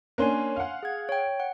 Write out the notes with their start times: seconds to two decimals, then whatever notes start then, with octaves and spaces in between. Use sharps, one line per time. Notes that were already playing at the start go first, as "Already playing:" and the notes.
0.18 A#3 C#4 D4 G#5 C6 F#6
0.56 F5 F#5
0.83 G#4 G#6
1.09 C#5 G5
1.40 F#5